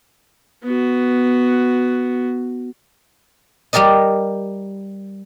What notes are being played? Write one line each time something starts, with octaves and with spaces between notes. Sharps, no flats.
B3 F#4
G3 G4 A#4 D5 D#5